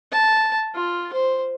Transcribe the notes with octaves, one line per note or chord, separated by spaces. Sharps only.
A5
F4
C5